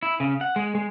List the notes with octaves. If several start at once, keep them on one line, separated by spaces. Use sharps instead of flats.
E4
C#3
F#5
G#3
G#3